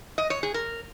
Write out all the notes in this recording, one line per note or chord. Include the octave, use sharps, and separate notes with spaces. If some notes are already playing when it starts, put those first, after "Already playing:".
D#5
C#5
G#4
A#4